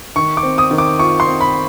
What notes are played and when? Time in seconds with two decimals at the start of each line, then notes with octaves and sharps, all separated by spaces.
0.16 D#3 C#6
0.37 D6
0.43 C4
0.58 D#6
0.71 D#3
0.78 D6
0.99 F4 C#6
1.20 C6
1.27 C4
1.41 B5